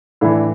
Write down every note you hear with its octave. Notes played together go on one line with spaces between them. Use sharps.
A2 E3 D4 E4